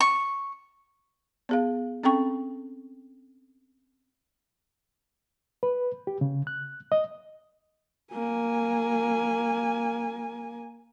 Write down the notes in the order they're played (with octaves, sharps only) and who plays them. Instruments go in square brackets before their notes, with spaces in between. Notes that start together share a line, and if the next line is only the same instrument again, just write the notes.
[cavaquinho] C#6
[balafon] B3 G#4 F5
C4 C#4 A4 G5 C#6
[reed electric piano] B4
G4
C#3
F#6
D#5
[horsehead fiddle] A#3 G#5